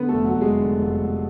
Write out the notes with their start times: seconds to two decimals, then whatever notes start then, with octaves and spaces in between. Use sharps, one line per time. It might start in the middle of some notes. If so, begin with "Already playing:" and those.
Already playing: D3 B3 B4
0.09 A3 A4
0.14 F1
0.25 F#3 F#4
0.35 F1
0.41 G#3 G#4
0.57 D3
0.79 F1
1.01 F1